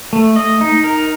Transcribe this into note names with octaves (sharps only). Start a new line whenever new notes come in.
A3
D#5
D#4
A#4